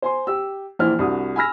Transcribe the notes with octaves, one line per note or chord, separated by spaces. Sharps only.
C5 G#5 C6
G4 E6
A#1 E3 C5 F6
C2 D4 F#4 D#6
G#5 B5 E6 F6 A#6